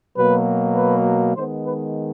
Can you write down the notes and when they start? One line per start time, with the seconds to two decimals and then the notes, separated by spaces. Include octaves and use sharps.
0.16 B2 F#3 A#3 B4
0.76 B4
1.35 D#3 G#3 B3 C5
1.65 B4